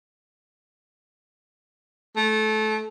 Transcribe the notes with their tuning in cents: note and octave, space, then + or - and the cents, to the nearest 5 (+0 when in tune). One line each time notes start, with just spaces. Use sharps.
A3 -20